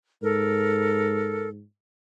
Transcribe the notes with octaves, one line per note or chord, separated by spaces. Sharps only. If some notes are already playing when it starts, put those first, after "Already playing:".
G#2 A4 A#4